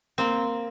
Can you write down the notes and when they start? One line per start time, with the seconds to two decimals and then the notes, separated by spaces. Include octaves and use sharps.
0.18 A#3 C4